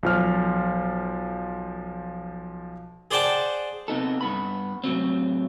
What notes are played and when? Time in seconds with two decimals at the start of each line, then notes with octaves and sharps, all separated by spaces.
0.03 B1 F3 F6
3.11 G#4 C5 D5 F#5 G5 A5
3.88 C3 B3 D#4 A4
4.21 G2 B3 B5
4.84 A2 C3 F#3 C4